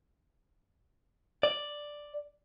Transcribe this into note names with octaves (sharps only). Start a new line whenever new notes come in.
D5